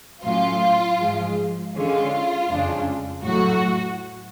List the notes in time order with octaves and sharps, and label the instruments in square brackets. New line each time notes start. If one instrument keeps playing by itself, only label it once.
[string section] A2 F#3 C#4 F4
G#2 F3 G#3
D3 G#3 C#4 F4
F2 C#3 G#3 D4
A2 F#3 A3 F#4